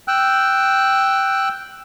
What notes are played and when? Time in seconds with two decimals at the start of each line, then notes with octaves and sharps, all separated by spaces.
0.08 G5 E6 F#6